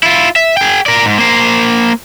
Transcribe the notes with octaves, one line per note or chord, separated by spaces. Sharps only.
E4 F4
E5
G#4 G5
A#4 D5
G#2
A#3 C5